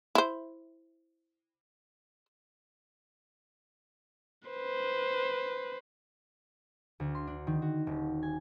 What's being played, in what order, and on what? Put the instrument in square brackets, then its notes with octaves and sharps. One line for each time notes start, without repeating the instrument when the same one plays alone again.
[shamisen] E4 C5
[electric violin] B4 C5
[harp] D2
C6
D4
D#3
F#4
D#1
G#5